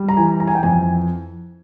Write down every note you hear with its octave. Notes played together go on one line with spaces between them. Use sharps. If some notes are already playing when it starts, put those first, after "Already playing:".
Already playing: G3
A#5
E3 G#5
A#5
G#5
G5
F2 G#5